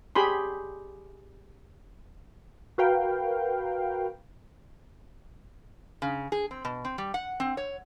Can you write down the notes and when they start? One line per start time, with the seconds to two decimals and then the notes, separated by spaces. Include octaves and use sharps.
0.15 G4 G#4 B5 C6
2.78 F#4 A#4 B4 F5 G5
6.02 C#3
6.32 G#4
6.51 C4
6.65 B2
6.85 C4
6.98 G3
7.14 F#5
7.40 C4
7.57 C#5